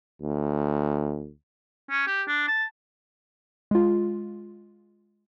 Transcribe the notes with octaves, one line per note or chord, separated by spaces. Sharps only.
D2
C#4
G4
D4
A5
G#3 F4